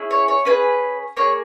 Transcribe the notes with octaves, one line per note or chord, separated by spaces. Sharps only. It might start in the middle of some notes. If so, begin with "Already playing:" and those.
Already playing: C#4 E4 G#4
C#5
C#5
C#4 E4 G#4 B4
A#3 D#4 G#4 C#5